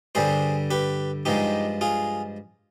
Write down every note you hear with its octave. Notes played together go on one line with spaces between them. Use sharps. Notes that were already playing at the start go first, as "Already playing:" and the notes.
G2 D3 G3 G#4 C5
G4 B4
G2 F3 G#3 D#4 G4
F4 G#4